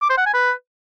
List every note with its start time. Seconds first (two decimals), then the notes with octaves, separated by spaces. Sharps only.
0.02 D6
0.10 C5
0.18 F#5
0.26 G#5
0.34 B4